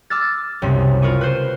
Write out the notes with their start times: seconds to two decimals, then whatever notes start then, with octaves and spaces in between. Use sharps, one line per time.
0.10 D6 E6 F6 A6
0.62 F#1 C2 C3 B6
1.02 F4 A#4 B5 C#6 D#7
1.21 B4 C5